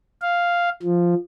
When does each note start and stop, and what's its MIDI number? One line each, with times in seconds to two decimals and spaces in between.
0.22 0.69 77
0.83 1.15 53